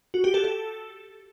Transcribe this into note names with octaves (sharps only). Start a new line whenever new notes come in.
F#4
G4
A4
A4